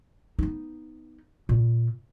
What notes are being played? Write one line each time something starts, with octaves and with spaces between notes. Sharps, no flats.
B3 D#4
A#2